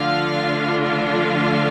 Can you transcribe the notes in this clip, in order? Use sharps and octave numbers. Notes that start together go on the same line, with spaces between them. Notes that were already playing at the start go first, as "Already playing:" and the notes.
Already playing: D3 F3 A3 D4 F4 F5
F5